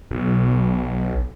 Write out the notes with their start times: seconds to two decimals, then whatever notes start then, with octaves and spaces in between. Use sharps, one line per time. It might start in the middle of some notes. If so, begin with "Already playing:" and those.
0.11 B1